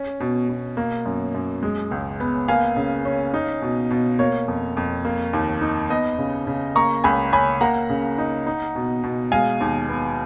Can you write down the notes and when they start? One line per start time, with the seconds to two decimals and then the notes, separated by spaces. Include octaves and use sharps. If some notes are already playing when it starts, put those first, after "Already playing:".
Already playing: C#4
0.20 B2
0.49 B2
0.77 A#3
1.06 F#2
1.35 F#2
1.63 G#3
1.91 C#2
2.20 B3
2.48 A#3 F5 G#5
2.77 C#3
3.05 C#4
3.34 D#4
3.62 B2
3.90 B2
4.19 A#3 C#5
4.48 F2
4.77 F2
5.05 A#3
5.33 D#2
5.62 D#4
5.90 B3 D#5
6.18 C#3
6.47 C#3
6.75 A#3 A#5 C#6
7.04 C#2 G#5 B5
7.33 C#4 G#5 B5
7.61 A#3 F#5 A#5
7.90 C#3
8.18 D#4
8.46 D#4
8.75 B2
9.03 B2
9.32 G#3 F5 G#5
9.61 D#2
9.89 B3